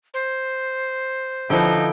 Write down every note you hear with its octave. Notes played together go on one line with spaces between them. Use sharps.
C5
D3 F3 D#4 E4 B4 G5